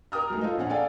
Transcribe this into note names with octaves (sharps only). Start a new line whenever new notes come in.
A#4 G5 D#6 F6
F#3 G#3 A3 D#4
F4 A4 C5 D#5
A#1 C#4 F#5
G#4 A4 D5 F5 G5 G#5